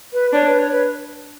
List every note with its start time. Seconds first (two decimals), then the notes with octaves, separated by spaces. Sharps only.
0.13 B4
0.32 D4 C#5
0.46 B4
0.59 C#5
0.72 B4